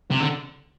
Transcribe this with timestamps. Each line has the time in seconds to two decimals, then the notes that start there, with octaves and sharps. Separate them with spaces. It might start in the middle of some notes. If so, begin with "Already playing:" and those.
0.11 C3
0.21 D3